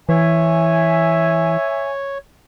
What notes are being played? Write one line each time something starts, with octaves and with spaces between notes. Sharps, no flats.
E3 C#5 E5 G#5